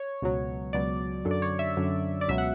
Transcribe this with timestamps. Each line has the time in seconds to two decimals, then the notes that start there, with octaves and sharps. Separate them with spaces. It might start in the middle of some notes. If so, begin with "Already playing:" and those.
Already playing: C#5
0.22 C#2 B2 F#3
0.73 C#2 B2 F#3 D5
1.25 F#2 D3 F#3
1.31 D5
1.42 C#5
1.59 E5
1.77 F#2 D3 F#3
2.21 D5
2.28 C#2 B2 F#3 E5
2.38 F#5